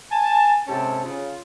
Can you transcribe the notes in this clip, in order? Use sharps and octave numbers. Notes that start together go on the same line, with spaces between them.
G#5 A5
G#2 C3 C#4 G4 A4 A5
C#3 F4